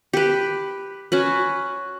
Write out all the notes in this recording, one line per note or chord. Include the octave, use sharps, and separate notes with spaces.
G4 B4
C#4 F#4 B4